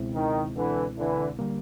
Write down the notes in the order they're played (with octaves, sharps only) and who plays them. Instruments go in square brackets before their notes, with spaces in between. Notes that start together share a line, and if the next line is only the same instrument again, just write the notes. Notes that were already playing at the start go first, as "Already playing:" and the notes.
Already playing: [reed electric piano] C#2 B2 G#3 C4 E4
[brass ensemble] D#3
D3 E3
D3 E3
[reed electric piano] D3 G3 A#3